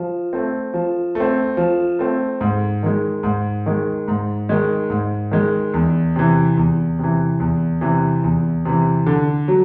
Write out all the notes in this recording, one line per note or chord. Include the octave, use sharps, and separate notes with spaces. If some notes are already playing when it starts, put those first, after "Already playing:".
Already playing: F3
A3 C4
F3
A3 C4
F3
A3 C4
G#2
D#3 G#3
G#2
D#3 G#3
G#2
D#3 G#3
G#2
D#3 G#3
E2
C3 E3
E2
C3 E3
E2
C3 E3
E2
C3 E3
D3
F#3